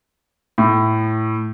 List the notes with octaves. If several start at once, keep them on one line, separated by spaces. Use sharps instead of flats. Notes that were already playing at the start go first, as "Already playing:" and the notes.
A2